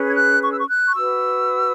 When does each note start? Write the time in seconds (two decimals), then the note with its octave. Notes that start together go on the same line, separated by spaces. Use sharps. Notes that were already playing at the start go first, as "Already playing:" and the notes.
Already playing: C#4 G#4 B4
0.08 G#6
0.14 F#6
0.41 C#6
0.51 E6
0.58 C#6
0.68 F#6
0.87 C#6
0.95 F#4 B4 E6